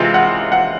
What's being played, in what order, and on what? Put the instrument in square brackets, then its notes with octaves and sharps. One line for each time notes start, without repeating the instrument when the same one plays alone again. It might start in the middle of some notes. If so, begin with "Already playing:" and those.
Already playing: [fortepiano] C3 E3 G#3 C4 F4 [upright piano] F5
[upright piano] F#5
F#5